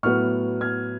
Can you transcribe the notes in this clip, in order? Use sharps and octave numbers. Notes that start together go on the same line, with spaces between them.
A2 F#3 B3 C#6 F6
F6 G#6